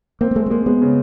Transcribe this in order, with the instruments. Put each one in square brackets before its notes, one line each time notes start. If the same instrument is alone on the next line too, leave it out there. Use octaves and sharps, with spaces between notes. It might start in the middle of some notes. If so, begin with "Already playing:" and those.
[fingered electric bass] A#3 [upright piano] C4
[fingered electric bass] A#3
[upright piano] G#3 [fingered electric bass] A3
[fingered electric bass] A3
[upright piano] G#3 [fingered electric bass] A#3
[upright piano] G#3 [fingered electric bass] B3
[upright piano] C#3